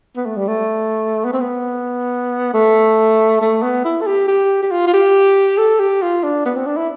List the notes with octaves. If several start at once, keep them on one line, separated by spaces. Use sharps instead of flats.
B3
A3
G3
A3
B3
C4
B3
A3
A3
B3
E4
A4
G4
G4
G4
F4
F4
G4
A4
G4
F4
D4
B3
C4
D4
E4